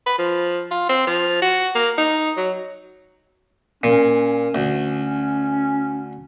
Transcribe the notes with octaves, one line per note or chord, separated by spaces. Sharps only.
B4
F3
F4
C4
F3
F#4
A#3
D#4
F#3
A#2 C#4
D2